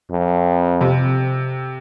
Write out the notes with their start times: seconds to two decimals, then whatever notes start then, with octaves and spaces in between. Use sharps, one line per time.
0.11 F2
0.81 C3